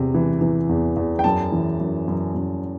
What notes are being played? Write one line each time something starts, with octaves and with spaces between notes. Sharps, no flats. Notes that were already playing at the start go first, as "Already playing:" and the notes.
Already playing: E2 C3
E3
E3
E2
E2
G5
F#2 A5
E3
F#2
F#2
F#2